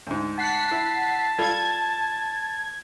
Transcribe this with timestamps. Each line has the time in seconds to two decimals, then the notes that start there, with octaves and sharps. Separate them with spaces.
0.07 D2 G#2
0.38 F#5 A5 B6 C7
0.71 E4
1.38 G3 F4 A4 G#6